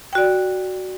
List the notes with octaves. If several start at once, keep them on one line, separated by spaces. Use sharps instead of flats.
F#4 D5 G5